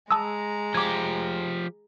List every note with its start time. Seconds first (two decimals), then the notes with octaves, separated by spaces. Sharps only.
0.11 G#3 A5 A#5 D#6 E6
0.74 F3 G4 D6 G#6